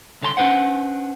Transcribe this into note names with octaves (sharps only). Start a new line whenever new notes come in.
C2 D3 C#5 A5 C6
C#4 D4 B4 C5 F#5